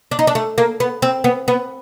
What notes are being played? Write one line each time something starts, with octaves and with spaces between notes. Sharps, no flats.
D4
D#4
D4
A3
A#3
B3
C4
B3
B3